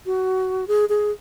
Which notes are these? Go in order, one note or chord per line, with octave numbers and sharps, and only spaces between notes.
F#4
G#4
G#4